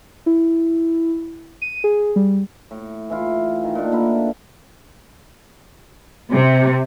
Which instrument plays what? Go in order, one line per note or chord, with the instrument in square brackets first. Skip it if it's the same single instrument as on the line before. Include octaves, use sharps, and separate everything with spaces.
[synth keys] E4
D#7
G#4
G3
[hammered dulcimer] A2
E3 E4 F4
D#3
A#2 D4
D3 A#3 E4 B4
[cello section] C3